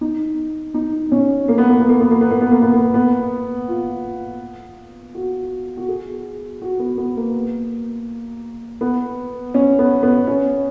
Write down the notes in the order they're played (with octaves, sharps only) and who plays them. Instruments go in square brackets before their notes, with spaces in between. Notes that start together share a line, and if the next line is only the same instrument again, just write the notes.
[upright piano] D#4
D#4
C#4
A#3
B3
A#3
B3
A#3
B3
A#3
B3
A#3
B3
A#3
B3
A#3
B3
F4
F#4
F#4
G#4
F#4
B3
B3
A#3
B3
C#4
B3
B3
C#4